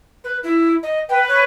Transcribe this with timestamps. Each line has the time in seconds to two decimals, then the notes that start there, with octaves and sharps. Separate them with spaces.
0.24 B4
0.43 E4
0.83 D#5
1.09 B4 G5
1.28 C#5